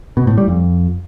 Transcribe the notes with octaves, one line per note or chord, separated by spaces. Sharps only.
B2
A2
G3
F2